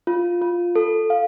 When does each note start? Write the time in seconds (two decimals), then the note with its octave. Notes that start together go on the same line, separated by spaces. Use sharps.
0.07 F4
0.42 F4
0.76 A4
1.10 F5